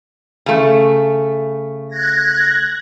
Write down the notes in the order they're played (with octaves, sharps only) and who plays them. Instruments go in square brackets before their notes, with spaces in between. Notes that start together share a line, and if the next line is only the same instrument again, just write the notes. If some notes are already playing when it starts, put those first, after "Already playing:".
[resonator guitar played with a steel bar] C#3 A3
[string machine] F#6 G#6 A#6